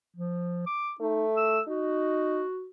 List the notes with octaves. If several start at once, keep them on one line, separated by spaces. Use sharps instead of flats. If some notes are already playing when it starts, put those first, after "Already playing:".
F3
D6
A3 D#4
E6
D#4 F#4